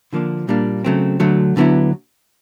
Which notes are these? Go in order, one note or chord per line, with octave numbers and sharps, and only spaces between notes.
D3 F3 A#3 D4
A#2 G3 A#3 D4
C#3 F#3 A3 C4
D2 D3 F#3 A3
D2 D3 F#3 B3 E4